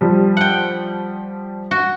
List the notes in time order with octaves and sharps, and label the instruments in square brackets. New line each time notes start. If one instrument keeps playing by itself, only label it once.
[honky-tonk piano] F3 G3
[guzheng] F#5 G5
F#4